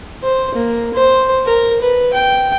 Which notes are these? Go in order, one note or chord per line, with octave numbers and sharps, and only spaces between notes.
C5
A#3
C5
A#4
B4
G5